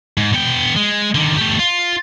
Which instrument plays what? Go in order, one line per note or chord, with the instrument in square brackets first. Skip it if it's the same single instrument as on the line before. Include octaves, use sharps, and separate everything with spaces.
[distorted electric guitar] G#2
B3 G5
G#3
D3 D#3
A3 G4
F4